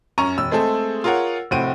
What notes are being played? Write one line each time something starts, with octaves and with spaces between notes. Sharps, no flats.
F#2 C#4 A#5 C#6 D#7
E1 E6
G#3 A3 C4 G#4 A4
F4 G#4 A#4 C#5 F#5
F1 A2 C4 F#4 D7 D#7